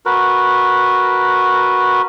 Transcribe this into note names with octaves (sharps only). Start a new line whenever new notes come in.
F#4 A#4 B4